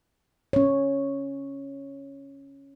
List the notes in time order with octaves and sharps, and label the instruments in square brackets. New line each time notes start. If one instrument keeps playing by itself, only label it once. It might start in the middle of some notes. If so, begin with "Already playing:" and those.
[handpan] C#4 C#5